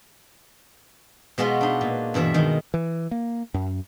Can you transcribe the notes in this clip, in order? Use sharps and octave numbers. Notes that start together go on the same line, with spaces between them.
B2 G#3 B3 F4 F#4
D4 D#4
A#2
G2 B2 E3 E5
D#3 G#3
E3
A#3
F#2